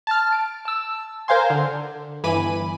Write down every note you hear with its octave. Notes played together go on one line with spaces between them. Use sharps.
A5 F6
D7
A5 E6
A#4 C5 F5 G#5 C6
D3
G1 E3 G#5 B5 D6 D#7